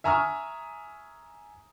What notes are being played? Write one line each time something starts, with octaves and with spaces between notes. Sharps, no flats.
E5 G#5 A#5 C#6 D#6 F6